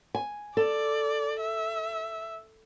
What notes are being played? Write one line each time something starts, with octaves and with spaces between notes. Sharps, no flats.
G#5
A4 D5
E5